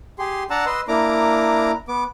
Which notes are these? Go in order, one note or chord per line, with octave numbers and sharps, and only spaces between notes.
G4 G#4 C6
D4 F#5 A5 A#5 E6
B4 D#5 C6 E6
A#3 D4 E4 A#5 D6
B3 D6